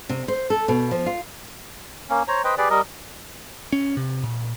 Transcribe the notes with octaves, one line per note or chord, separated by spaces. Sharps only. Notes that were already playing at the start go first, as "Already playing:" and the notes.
C3
C5
A4
B2
F3
F4
A#3 C#4
C5 C#5 A#5
B4 C5 D#5 G5
G4 G#4 B4 D5
G3 A#4 D#5
C#4
C3
A#2